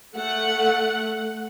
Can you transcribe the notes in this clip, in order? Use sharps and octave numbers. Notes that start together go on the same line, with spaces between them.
A3 F#5